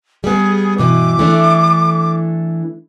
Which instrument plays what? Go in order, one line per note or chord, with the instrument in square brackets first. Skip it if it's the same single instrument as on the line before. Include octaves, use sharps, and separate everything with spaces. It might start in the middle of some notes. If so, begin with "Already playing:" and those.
[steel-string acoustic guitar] G3 B3 [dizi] G#4
[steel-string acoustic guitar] G2 B2 E3 [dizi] D6
[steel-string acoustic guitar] E3 A3 D4